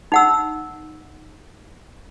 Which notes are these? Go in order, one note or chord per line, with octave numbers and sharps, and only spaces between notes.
D#4 F#5 E6